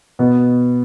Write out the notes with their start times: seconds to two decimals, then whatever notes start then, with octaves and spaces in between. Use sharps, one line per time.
0.19 B2 B3